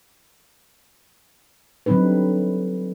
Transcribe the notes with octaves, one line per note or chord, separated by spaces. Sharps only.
D3 F#3 G3 C4 D#4 B4